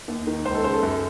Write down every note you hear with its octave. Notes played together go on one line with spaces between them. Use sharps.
D#2
D#3
C#2 C5
A4
C#3 C5
A4
F#2